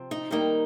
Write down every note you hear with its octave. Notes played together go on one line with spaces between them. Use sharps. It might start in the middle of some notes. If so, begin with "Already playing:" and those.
Already playing: C3 F3 C4
D#4
D#3 G3 A#3 D#4